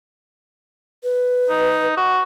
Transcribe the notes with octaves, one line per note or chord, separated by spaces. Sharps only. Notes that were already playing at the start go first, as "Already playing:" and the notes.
B4
D#4
F#4